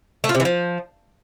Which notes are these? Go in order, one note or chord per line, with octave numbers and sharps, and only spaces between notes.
A3
F4
C3
E3
F3